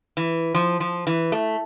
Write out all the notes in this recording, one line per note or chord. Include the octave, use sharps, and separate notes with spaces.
E3
F3
F3
E3
A3